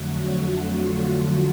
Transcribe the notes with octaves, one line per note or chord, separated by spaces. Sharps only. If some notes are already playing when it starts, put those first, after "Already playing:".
Already playing: F2 D3 F#3 A3 F#4
F4